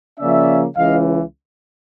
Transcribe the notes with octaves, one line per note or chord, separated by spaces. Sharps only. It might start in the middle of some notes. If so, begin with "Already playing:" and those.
C#3 F3 A#3 C#4 D5 E5
C#2 C#3 E3 D#5 F5